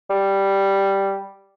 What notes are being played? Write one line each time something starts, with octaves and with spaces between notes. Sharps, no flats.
G3